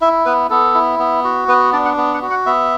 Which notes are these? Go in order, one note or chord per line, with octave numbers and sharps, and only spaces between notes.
E4 E5
B3 B4
B3 A4
E4
B3
F#4
B3 B4
D4 D5
F#5
B3
F#5
F#4
F#5
B3 E5